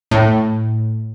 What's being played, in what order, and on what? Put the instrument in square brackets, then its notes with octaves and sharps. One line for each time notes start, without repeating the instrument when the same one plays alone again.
[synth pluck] A2